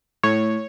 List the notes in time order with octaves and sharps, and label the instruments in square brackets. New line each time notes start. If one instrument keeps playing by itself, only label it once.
[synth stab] A2 C#5